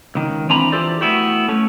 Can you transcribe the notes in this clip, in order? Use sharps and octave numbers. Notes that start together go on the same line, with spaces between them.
C#2 D#3
E3 C4 D4 G#5 A#5 B5
E3 F4 G4 A4 C5 D5
A3 B3 E4 F#4 G4
A3 C#4